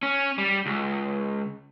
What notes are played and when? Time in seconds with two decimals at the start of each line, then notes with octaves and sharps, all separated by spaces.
0.03 C#4
0.38 G3
0.66 C#2